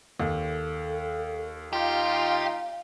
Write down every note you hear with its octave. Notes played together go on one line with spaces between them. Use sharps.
D#2 A4
D#4 F4 G4 F5